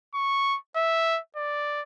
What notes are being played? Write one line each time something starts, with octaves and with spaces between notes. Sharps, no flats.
C#6
E5
D5